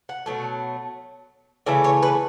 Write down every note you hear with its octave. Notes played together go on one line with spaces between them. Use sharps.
F#5
B2 F#3 A3
C#3 E3 A3 E5
C#5
B4